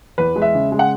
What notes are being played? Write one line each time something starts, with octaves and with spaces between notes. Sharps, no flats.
E2 B4
G#3
E5
C#3
G#3
F#5